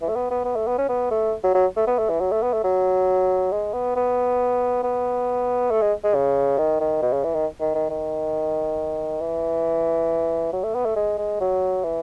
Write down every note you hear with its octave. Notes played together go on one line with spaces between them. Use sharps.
E3
A3
B3
B3
B3
A3
B3
C#4
B3
A3
F#3
F#3
A3
B3
A3
E3
F#3
A3
B3
A3
F#3
G#3
B3
B3
B3
A3
G#3
G#3
C#3
D#3
D#3
B2
C#3
E3
D#3
D#3
D#3
D#3
E3
F#3
A3
B3
A3
G#3
G#3
F#3
E3